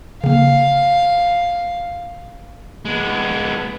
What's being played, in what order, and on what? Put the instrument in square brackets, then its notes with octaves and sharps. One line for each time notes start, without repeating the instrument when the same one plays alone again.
[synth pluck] C#3 A#3 [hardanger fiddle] F5
[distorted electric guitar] G#3 B3